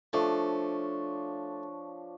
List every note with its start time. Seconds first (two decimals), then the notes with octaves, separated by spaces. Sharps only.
0.13 F3 A3 D4 C#5